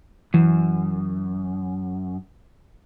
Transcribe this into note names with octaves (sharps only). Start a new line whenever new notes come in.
F#2 E3